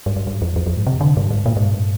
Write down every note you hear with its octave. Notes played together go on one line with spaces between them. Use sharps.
G2
G2
G2
F2
F2
F2
G#2
C3
D3
G2
G#2
A#2
G#2
G2